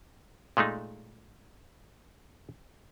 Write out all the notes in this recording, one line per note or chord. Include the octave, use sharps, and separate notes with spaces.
A#2 G#3 A3 D#4